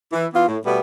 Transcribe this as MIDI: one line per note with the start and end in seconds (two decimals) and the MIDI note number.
0.13 0.26 52
0.34 0.45 52
0.34 0.45 59
0.34 0.45 65
0.47 0.58 45
0.65 0.81 47
0.65 0.81 55
0.65 0.81 57
0.65 0.81 59